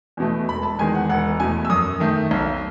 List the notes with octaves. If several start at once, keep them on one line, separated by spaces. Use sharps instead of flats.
E2 B2 A3
E1 B5
A5
E2 D#3 G#3 G#5
F#5
E1 F#5
E2 B2 A3 G#5
E6
F#2 D#6
D#3 A3
B1